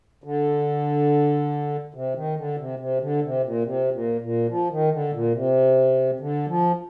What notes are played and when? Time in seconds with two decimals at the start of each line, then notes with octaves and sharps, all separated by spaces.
0.24 D3
1.94 C3
2.15 D#3
2.37 D3
2.58 C3
2.79 C3
3.01 D3
3.23 C3
3.44 A#2
3.64 C3
3.92 A#2
4.21 A#2
4.49 F3
4.70 D#3
4.92 D3
5.14 A#2
5.34 C3
6.20 D3
6.48 F3